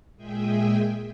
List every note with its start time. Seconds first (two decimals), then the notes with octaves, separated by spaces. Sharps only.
0.16 A#2 G#3 G#4 E5 G5 G#5